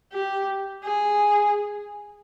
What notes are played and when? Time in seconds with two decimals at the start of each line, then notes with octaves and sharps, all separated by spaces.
0.12 G4
0.84 G#4